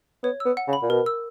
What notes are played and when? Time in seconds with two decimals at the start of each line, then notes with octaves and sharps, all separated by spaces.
0.23 B3 C#5
0.40 B3 E6
0.57 F#5
0.68 C#3
0.73 B5
0.82 A#2
0.90 B2 A#4
1.06 E6